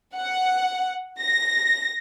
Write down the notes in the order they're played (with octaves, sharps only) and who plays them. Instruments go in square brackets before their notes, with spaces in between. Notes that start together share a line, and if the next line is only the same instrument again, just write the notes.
[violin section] F#5
A#6